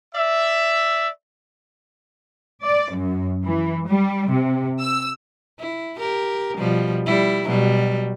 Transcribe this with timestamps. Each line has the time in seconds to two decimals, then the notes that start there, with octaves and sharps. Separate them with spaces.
0.15 D5 E5
2.63 D5
2.93 F#2
3.45 E3
3.88 G3
4.30 C3
4.80 E6
5.60 E4
5.99 G4 A#4
6.57 B2 F3 G3
7.06 G3 E4
7.45 B2 F#3 G3